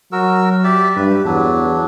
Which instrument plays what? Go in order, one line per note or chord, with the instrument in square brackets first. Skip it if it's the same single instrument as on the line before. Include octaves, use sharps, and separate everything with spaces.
[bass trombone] F#3 [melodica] F#4 A#4 E6
[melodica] G4 D5 E5
[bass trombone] G2 [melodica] B4
[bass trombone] E2 [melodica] F#3 D4